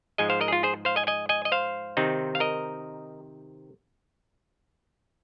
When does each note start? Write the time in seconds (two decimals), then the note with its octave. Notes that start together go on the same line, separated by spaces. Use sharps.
0.18 G#2 F3 G#3 D#5 G#5
0.30 C5 F5
0.41 A#4 D#5
0.48 G#4
0.52 F4
0.63 G#4 C5
0.85 C5 F5
0.96 D#5 G#5
1.07 D#5 G#5
1.29 D#5 G#5
1.45 D#5
1.52 C5 F5
1.97 C3 D#3 C4 D#4
2.35 F5
2.40 A#4 D#5